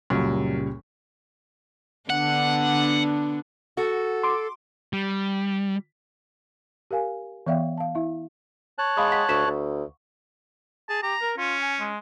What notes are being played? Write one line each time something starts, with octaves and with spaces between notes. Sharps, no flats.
C#2 F#2 A#2 G3
D3 B3 D4 F#5
F#4 A4
C6 D6
G3
G4 A#4 F5 G#5
E3 B3 D5 E5 F5 G5
F5 A5
E4 E5
C#5 A5 F#6
G#3 F5 B5 D#6
F#5 B6
D2 C#6 B6 E7
D2
G#4 A5
G4 A#5
A#4
C#4 F4
G#5
G#3